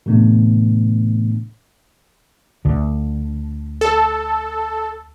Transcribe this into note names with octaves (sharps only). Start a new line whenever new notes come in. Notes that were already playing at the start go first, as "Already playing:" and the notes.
A2 C3 E3 A3 B3 D4
D2 D3
A4